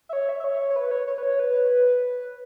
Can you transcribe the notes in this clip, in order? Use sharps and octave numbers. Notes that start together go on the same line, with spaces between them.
E5
C#5
E5
E5
C#5
C#5
B4
C#5
C#5
B4
C#5
B4